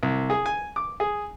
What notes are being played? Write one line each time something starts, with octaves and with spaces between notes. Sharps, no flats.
C2
G#4
G#5
D6
G#4